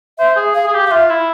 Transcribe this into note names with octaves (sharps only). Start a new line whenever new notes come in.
C5 E5
G#4
G#4 F5
G#4
G4
G4 F5
F4 E5
E4